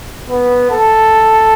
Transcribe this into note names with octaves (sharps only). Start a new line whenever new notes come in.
B3
A4